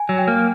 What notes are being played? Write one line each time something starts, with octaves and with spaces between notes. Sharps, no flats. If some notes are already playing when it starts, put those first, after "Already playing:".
Already playing: G#5
F#3
G5
A#3